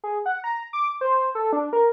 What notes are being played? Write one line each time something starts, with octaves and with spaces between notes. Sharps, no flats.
G#4
F#5
A#5
D6
C5
A4
D4
A#4